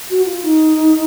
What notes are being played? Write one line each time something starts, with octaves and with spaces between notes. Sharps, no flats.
F#4
F4
D#4